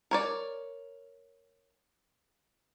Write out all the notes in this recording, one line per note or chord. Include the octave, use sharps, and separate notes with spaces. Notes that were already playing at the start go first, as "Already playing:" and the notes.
A#4 C#5 D5